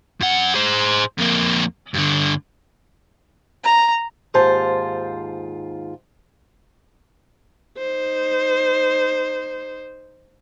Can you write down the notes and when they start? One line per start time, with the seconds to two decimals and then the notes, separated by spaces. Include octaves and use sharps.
0.20 F#2 F#5
0.54 G#4 C5
1.18 F2 A#3
1.94 G2 D3
3.64 A#5
4.34 D#2 G#2 F4 C5 A5
7.78 D#4 C5